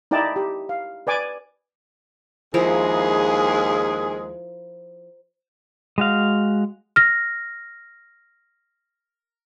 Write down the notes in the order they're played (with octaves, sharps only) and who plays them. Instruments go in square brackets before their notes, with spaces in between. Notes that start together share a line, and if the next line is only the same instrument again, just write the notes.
[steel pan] D#4 E4 D5 G5 A5
G4
F5
B4 D5 G#5 D6
[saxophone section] D#2 G#3 G#4 [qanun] F3 E4 A#4
[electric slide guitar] G#3 F#4 F5
[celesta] F6 A#6